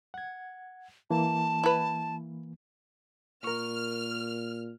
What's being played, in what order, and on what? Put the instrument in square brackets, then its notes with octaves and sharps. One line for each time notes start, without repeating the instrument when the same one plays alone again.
[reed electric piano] F#5 G#6
[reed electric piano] E3 A#3 [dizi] A5
[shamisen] E4 B4
[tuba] A#2 [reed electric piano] A#4 C#6 [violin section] F6